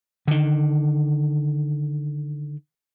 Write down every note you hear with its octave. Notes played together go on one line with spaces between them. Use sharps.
D3 D#3